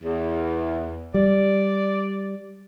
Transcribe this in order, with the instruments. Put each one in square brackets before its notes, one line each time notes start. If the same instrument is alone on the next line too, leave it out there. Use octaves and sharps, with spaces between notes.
[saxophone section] E2
[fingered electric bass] G3 [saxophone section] D5